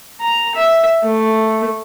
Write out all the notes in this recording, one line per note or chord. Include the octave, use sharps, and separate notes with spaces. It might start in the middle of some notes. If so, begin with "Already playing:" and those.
A#5
E5
A3